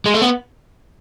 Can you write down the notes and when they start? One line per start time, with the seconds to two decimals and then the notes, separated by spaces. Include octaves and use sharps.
0.06 G#3
0.14 A3
0.21 B3